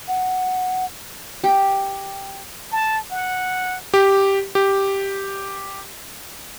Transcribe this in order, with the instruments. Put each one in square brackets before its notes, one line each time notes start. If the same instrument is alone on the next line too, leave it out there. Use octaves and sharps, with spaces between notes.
[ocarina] F#5
[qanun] G4
[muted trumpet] A5
F#5
[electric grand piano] G4
G4